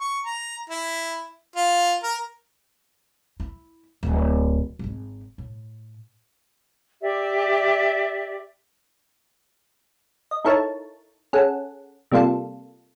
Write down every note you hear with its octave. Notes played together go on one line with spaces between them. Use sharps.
C#6
A#5
E4
F4
A#4
E4
D1 E4
G#1 G#3
A2
G4 D5 E5
D#5
D#4 E4 A4 A#4 C#5 A5
C#4 G#4 A4 F#5
C3 G3 A#3 F4 A4